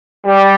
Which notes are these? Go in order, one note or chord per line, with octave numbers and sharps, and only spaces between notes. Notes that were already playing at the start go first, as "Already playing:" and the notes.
G3